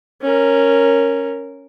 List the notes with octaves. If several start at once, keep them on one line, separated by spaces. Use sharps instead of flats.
C#4 A#4